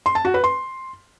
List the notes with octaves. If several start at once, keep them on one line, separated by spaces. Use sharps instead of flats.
C6
A5
F#4
B4
C6